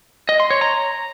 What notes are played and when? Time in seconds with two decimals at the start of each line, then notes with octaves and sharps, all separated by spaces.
0.29 D#5
0.40 C6
0.50 C#5
0.61 A#5